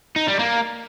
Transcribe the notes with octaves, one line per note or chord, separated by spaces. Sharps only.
D#4
G3
A#3